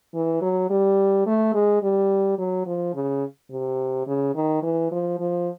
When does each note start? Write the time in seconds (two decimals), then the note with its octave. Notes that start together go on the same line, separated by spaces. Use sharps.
0.14 E3
0.42 F#3
0.70 G3
1.27 A3
1.54 G#3
1.83 G3
2.38 F#3
2.66 F3
2.94 C#3
3.51 C3
4.07 C#3
4.35 D#3
4.63 E3
4.92 F3
5.20 F3